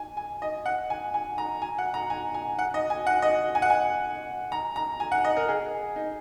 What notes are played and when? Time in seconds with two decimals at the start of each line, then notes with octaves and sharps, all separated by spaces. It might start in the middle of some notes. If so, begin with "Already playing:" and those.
Already playing: G#5
0.17 G#5
0.42 D#5
0.66 F#5
0.90 G#5
1.14 G#5
1.38 A#5
1.62 G#5
1.78 F#5
1.94 A#5
2.10 G#5
2.34 G#5
2.59 F#5
2.74 D#5
2.90 G#5
3.07 F#5
3.22 D#5
3.55 G#5
3.62 F#5
3.70 G#5
4.52 A#5
4.76 A#5
5.00 G#5
5.12 F#5
5.25 D#5
5.37 A#4
5.48 G#4
5.96 D#4